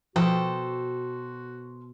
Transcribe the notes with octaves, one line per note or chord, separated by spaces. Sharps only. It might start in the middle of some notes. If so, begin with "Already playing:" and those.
B2 F3 F#4 A4 C5 G5